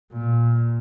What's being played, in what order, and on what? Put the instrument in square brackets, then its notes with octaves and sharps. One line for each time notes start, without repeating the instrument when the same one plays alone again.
[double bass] A#2